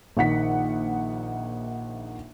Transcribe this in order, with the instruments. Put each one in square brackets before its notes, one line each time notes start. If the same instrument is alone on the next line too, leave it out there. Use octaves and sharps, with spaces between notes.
[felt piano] A#1 D#3 F#5 B6